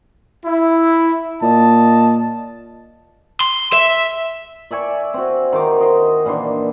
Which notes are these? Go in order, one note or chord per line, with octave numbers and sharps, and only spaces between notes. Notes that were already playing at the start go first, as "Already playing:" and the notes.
E4
A#2 D#5 A5
C6
E5
D5 E5 G#5 C#6
C4 F#4
D#3 C5 D6
D#5 C6
A#2 E3 D4 C6